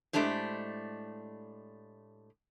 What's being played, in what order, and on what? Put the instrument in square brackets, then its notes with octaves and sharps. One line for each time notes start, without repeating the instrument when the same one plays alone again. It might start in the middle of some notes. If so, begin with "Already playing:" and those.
[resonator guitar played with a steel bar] A2 G#3 A3 D4 G4 C5